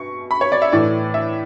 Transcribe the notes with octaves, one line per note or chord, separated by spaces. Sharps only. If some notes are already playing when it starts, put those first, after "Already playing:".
Already playing: B2 C#6
B5
C#5
D5
E5
A2 E3 A3 D5
E5